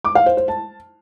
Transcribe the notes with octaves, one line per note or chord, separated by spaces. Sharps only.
D6
F5
C5
C5
A5